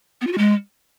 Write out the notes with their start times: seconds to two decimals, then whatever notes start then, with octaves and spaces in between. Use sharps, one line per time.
0.21 B3
0.27 F4
0.32 F#4
0.38 G#3